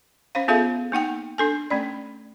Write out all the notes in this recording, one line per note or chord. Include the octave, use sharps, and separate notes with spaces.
C#4 C5 F5
B3 F4 G#4 A4 E5 F5
A#3 D#4 F#5 G5
D4 A4 G#5
A3 C#4 D5